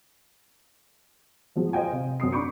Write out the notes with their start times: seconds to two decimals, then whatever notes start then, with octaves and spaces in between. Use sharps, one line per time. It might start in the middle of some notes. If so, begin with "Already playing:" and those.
1.56 F3 F#3 G#3
1.73 C5 D#5 F5 G5 G#5
1.92 C3
2.20 F#2 C4 D#6 C7
2.32 D4 B5 C#6 D6 G6 C#7